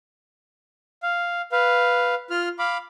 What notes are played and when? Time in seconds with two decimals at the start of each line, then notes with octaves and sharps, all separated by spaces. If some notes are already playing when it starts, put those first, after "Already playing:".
1.03 F5
1.52 B4 F5
2.30 F4 F6
2.59 F5 B5 D6